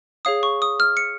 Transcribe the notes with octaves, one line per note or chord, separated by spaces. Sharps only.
G#4 C#5 F5 D#6
C#6
D#6
F6
C#7